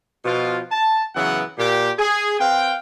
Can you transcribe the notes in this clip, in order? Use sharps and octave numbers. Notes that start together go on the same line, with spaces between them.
B2 F3 F4
A5
F#2 C#3 E3 F#3 B3 F#5
A#2 G4
G#4
C4 B4 F5 G5